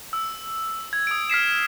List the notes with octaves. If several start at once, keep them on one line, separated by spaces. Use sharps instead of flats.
E6
G#6
D#6 D7
F6 B6 C7 E7